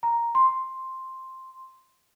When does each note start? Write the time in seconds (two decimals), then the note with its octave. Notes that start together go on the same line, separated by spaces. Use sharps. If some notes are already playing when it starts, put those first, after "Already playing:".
0.03 A#5
0.35 C6